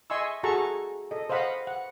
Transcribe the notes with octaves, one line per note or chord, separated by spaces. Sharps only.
D#5 E5 G#5 C6 C#6 E6
F#4 G#4 A4 A5 A#5 C#6
A4 D#5
C5 D#5 F5 F#5 B5
F#5